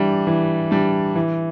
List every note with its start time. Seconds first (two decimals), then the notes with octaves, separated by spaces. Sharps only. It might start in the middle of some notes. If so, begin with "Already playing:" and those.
Already playing: E3 G3 D4
0.27 E3
0.71 G3 D4
1.16 E3